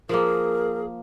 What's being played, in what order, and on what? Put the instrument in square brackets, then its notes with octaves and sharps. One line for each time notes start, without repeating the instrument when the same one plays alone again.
[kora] F3 A#3 [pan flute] G#4 [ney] A#4